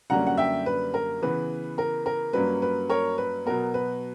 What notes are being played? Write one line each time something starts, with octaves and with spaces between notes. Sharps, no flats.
F#2 D3 G3 A#3 C#4 F#5 A#5
F#5
E5 G5
B4
A#4
C#3 E3 B3 B4
A#4
A#4
G2 F#3 A#3 C#4 B4
B4
A#4 C#5
B4
B2 F#3 B3 A#4
B4